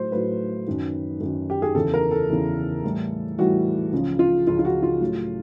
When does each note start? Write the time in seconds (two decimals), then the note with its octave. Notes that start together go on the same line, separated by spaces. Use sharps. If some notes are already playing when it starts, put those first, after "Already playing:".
Already playing: A2 F#3 C5
0.12 A2 F#3 B4
0.67 F#2 D#3 F#3
1.21 F#2 D#3 F#3
1.50 G4
1.62 G#4
1.75 E2 C#3 E3 A4
1.94 A#4
2.11 A4
2.30 E2 C#3 E3
2.84 A2 E3 G3
3.39 A2 E3 G3 F#4
3.93 C#2 C#3 F3
4.19 F4
4.46 C#2 C#3 F3 F4
4.59 F4
4.65 F#4
4.83 F4
5.01 A2 F#3